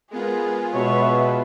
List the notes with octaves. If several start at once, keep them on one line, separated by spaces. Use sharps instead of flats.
G#3 B3 F4 G#4 A#4
B2 B4 C#5 E5